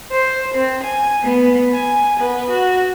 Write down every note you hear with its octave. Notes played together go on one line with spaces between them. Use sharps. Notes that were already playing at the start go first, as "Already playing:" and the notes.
C5
C4
G#5
B3
G#5
B3
F#4